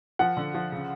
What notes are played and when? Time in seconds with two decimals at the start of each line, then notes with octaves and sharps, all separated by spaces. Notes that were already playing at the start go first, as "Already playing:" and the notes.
0.19 F3 F#5
0.37 D3
0.54 F3
0.72 C#3